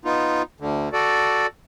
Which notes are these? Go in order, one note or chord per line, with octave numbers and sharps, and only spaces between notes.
B3 D#4 F4
D2 D3
F#4 A4 D5